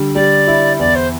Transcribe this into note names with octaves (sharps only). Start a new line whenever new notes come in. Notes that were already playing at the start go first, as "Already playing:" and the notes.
Already playing: D3 G3
G3 D5
E4
E2 D5
C5